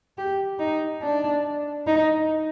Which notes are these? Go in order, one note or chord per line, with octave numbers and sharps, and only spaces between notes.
G4
D#4
D4
D#4